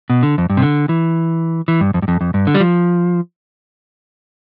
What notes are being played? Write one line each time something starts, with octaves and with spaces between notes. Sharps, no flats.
B2
D3
F2
G2
C3
D3
E3
E3
G2
F2
G2
F2
F2
G2
D3
G3
F3